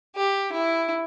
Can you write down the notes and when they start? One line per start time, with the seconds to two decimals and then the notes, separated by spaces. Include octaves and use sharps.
0.16 G4
0.52 E4